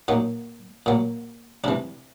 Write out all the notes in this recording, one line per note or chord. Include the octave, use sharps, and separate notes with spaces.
A#2 F#3 D#4
A#2 F#3
C3 E3 D4